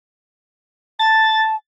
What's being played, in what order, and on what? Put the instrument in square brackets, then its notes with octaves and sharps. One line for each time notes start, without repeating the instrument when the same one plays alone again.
[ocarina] A5 [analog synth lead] A6